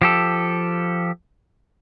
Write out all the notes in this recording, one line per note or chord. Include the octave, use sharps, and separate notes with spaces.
F3 G4 A4